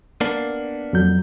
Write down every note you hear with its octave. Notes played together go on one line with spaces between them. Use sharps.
A#3 B3 D4
F2 F#3 G6